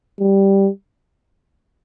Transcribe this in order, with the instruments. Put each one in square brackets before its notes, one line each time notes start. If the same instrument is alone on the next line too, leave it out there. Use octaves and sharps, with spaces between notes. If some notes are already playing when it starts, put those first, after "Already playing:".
[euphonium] G3